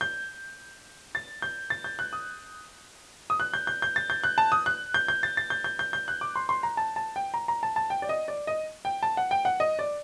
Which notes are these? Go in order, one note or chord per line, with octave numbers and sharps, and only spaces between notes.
G6
A6
G6
A6
G6
F#6
D#6
D#6
F#6
G6
G6
G6
A6
G6
F#6
A5
D#6
F#6
G6
G6
A6
A6
G6
G6
G6
G6
F#6
D6
C6
C6
A#5
A5
A5
G5
A#5
A#5
A5
A5
G5
D5
D#5
D5
D#5
G5
A5
F#5
G5
F#5
D#5
D5